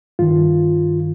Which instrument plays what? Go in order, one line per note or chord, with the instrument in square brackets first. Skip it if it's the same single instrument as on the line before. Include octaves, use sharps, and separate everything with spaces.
[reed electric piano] G2 D#3 F4